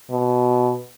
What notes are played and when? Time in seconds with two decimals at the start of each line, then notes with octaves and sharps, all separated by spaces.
0.11 B2